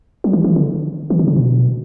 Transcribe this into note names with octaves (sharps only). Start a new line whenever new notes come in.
F#3
E3
E3
D3
E3
D3
C#3
B2